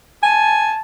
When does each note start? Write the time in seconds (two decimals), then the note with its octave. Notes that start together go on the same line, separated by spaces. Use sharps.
0.23 G#5 A5